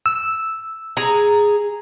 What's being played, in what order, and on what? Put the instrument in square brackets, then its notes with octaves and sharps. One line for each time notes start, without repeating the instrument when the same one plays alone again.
[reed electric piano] E6
[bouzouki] G#4 A#5